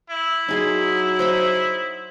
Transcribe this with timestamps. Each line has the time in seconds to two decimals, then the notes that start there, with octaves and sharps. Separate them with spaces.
0.10 E4
0.48 F#3 D#4 G#4 C6
1.19 C5 D#5 B5